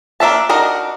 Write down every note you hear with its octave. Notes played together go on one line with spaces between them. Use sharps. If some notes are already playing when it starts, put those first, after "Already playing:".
A#3 D4 E5 A5
D4 D#4 F#4 A#4 D#5